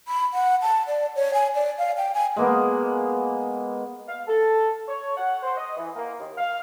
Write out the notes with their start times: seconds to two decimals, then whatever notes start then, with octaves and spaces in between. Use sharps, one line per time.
0.08 B5
0.34 F#5
0.62 A5
0.87 D5
1.16 C#5
1.34 G#5
1.55 D5
1.78 F5
1.97 G5
2.14 G#5
2.36 G#3 A#3 B3
4.08 F5
4.28 A4
4.88 C#5
5.17 F#5
5.43 C5
5.57 D#5
5.77 E3
5.96 A#3
6.20 D#2
6.37 F5